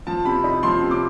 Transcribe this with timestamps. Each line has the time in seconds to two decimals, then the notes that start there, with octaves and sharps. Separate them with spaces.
0.07 F3 A5
0.25 C3 B5
0.44 D#4 B5
0.63 F3 C6
0.81 C3
0.91 D6